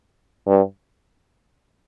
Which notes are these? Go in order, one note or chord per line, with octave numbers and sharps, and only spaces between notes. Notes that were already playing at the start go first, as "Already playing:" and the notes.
G2